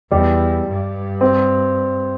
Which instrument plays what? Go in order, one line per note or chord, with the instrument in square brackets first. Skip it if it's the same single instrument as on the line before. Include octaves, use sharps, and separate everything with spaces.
[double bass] E2 [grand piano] G3
[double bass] G2
[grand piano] C4